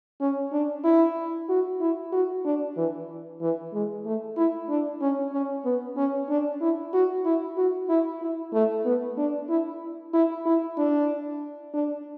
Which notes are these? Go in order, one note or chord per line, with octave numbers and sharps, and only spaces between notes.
C#4
D4
E4
F#4
E4
F#4
D4
E3
E3
G#3
A3
E4
D4
C#4
C#4
B3
C#4
D4
E4
F#4
E4
F#4
E4
E4
A3
B3
D4
E4
E4
E4
D4
D4